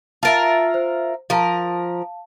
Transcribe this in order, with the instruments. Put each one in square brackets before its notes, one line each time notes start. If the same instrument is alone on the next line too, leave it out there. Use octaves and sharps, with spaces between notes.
[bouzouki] F4 A#4 E5 [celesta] A5 A6
[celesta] C5
[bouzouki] F3 A#4 [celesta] F5 A5